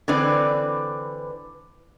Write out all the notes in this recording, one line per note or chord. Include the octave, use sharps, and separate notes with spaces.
D3 E3 C4 B4 D5